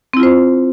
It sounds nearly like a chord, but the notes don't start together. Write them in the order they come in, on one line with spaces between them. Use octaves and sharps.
C4 E4 F4 C5